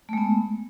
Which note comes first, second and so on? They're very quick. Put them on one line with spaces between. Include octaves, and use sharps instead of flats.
A3 G#3 B3